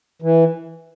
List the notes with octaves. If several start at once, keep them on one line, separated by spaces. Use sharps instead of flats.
E3